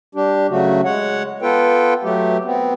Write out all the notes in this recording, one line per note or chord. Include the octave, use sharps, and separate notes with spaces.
G3 D4 G4
C#3 F#3 A3 F#4
G#3 C#5 F#5
B3 F4 A4 B4 G5
F#3 A3 G4
B3 C4